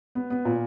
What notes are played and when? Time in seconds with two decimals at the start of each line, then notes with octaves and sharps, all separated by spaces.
0.15 B3
0.30 B3
0.45 A#2